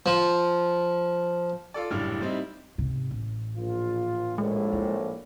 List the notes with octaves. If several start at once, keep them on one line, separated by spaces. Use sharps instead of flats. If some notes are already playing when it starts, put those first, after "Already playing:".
F3
F4 A4 D5
F#1 A2 G3 D4 F6
G3 C4 D#4 E4
G#2 C3
A1
A#1 F4
A#1 A2 G#3
E4